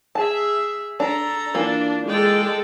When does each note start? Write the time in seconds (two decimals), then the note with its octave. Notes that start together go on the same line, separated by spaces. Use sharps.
0.15 G#4 E5 A5
1.00 D4 A4 A#5
1.54 E3 A#3 D4 F4
2.07 G#3 A4 D5 G5